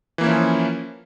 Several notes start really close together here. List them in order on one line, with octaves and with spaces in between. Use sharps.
E3 A#3 E4 C#4 F3